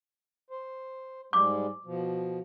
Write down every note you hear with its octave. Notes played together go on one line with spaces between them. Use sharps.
C5
G#2 G3 G#3 D6
B2 F3